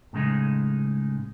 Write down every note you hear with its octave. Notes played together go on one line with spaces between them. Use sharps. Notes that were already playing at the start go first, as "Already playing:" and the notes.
A2 C#3 G#3 D#4